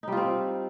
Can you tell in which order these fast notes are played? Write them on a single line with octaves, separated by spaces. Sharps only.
D#4 G3 F4 C4